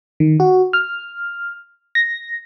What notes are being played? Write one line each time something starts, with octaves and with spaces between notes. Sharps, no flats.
D#3
F#4
F6
A#6